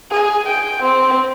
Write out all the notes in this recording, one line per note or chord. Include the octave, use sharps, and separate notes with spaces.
G#4
G5
C4